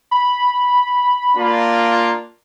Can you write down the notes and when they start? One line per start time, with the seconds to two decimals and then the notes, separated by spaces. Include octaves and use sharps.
0.11 B5
1.36 A#3 D4 F4